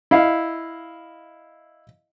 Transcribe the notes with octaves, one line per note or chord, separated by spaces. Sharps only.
E4 D#5 F5